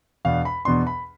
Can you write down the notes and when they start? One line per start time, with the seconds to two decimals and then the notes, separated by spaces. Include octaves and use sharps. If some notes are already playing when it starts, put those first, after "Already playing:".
0.25 E2 B2 B3 D4 F5
0.45 B5
0.65 E2 B2 B3 D4 C6
0.87 B5